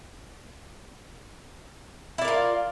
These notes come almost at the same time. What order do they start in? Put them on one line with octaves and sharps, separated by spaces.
E4 D5 A#4 F4